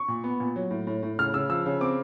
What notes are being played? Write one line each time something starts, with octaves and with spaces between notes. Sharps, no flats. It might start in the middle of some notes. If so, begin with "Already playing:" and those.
Already playing: C#6
A#2
B3
A#2
F#3
A2
A2
A2
C#3 F6
C#3 E6
F3 E6
C#3
C4 D6